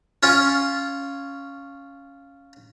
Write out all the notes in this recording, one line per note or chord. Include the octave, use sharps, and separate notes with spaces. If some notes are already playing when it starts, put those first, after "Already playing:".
C#4 F4